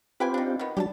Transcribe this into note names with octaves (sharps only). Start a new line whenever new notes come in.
C4 F4 G4 B4 G5 G#5
D4 D#4
D#3 B3
F#3 G3 D4 G4 A5